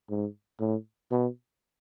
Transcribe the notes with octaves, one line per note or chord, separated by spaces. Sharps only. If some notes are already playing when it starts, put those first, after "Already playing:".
G#2
A2
B2